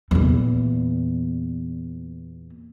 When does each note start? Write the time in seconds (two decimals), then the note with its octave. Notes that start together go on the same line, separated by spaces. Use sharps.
0.11 E2 A#2